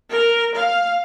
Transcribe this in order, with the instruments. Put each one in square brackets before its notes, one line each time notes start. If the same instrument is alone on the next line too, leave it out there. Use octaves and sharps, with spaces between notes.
[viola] A#4
F5